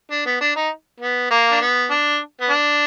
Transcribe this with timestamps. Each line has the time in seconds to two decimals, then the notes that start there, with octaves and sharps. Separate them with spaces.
0.11 D4
0.26 B3
0.41 D4
0.56 D#4
1.00 B3
1.31 A#3
1.52 D4
1.61 B3
1.90 D4
2.41 B3
2.50 D4